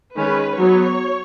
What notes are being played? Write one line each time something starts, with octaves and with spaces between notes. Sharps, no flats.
D#3 G#3 C#4 B4
F#3 B3 C#5